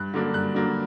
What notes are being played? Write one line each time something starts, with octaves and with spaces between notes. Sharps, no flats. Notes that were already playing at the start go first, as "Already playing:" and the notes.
Already playing: G2 F#6
D3 F#3 A#3 D4
G2 F#6
D3 F#3 A#3 D4